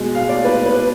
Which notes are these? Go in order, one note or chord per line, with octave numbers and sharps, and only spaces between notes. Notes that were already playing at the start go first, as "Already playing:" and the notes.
Already playing: B2 G#3
F5
D5
B4
B4